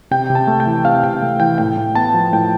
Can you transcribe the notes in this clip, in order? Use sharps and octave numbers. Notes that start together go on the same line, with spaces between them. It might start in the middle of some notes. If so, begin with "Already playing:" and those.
C3 G5
C3
A5
A3
G5
E3
C3 F5
C3 G5
A3
E3 G5
A2 G5
A2
B3 A5
F3
A2 G5